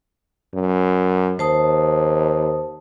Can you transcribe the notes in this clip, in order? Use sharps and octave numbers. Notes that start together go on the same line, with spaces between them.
F#2
D#2 C5 A5 D#6